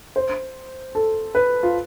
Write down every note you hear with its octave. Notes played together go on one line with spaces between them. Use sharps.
C5
A4
B4
F4